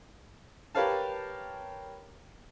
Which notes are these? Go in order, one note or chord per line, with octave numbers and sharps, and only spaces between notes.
G4 A#4 B4 C#5 F5 A5